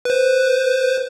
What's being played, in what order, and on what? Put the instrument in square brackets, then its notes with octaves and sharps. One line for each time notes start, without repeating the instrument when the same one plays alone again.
[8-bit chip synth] B4 C5